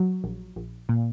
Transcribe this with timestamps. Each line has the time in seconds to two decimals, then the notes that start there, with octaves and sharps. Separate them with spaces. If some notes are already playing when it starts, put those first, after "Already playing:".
Already playing: F#3
0.24 A#1
0.56 A#1
0.89 A#2